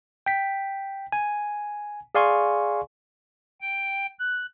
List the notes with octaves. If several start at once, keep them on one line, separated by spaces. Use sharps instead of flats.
G5 B6
G#5
G#4 D5 F5 G#5 C6 C#6
G5
F#6